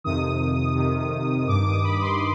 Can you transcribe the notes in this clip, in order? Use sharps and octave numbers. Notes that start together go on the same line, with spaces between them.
F2 C3 D#3 D#6
F2 C3 D#3
G2 D6
D#3
D#6
B5
C6